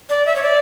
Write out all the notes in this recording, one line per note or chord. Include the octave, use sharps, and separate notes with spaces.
D5
E5
C#5
D5